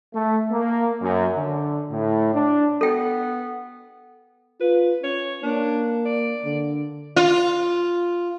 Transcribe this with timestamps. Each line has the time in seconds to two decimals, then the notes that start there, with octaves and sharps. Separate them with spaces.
0.14 A3
0.52 A#3
1.01 F#2
1.36 D3
1.91 A2
2.34 D4
2.81 B3 A4 G5
4.61 F4 B4
5.03 C#4 C#5
5.43 A#3 D4
6.05 D5
6.45 D3
7.16 F4